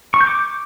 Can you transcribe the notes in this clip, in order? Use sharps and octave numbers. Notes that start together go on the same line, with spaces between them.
C#6
G6
D6